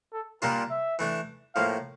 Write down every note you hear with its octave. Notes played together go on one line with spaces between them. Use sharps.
A4
A#2 G3 A#3 D4 F4 A#4
E5
E3 A3 D4
A2 F3 A#3 F5